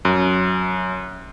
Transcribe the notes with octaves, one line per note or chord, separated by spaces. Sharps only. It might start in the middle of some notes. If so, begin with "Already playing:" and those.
F#2